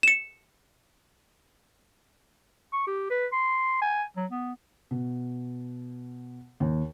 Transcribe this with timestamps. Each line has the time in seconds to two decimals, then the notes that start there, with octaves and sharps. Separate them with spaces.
0.03 C#7 E7
2.73 C#6
2.87 G4
3.10 B4
3.32 C6
3.81 G#5
4.16 F#3
4.31 B3
4.91 B2
6.60 D#2